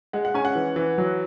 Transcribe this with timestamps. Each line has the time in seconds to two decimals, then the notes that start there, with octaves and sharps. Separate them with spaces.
0.13 G#3 F#5
0.25 F#5
0.34 C#4 G#5
0.45 F#5
0.55 E3
0.76 E3
0.98 F#3